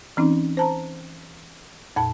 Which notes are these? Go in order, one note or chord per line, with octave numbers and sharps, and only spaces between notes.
E3 C4 C#4 D#4
C5 A5 A#5
F2 A#2 A5